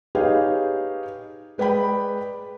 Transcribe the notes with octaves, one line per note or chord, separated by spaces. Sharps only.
D#4 G4 G#4 B4 C#5 F5
G#3 B4 D5 G5 B5